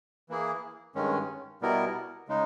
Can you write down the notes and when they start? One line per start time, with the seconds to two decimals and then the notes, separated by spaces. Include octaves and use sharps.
0.29 E3 A#3 E4 G#4
0.95 G2 D#3 G#3 C#4
1.61 B2 G3 B3 E4 A#4
2.28 C#3 G#3 D#4